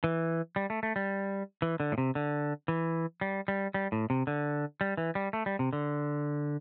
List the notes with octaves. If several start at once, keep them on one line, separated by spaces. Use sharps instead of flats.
E3
G3
A3
A3
G3
E3
D3
A2
C3
D3
E3
G3
G3
G3
A2
C3
D3
G3
E3
G3
A3
G3
C3
D3